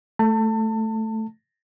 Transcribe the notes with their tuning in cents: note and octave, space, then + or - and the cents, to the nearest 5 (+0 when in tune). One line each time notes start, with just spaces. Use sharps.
A3 +0 A5 +30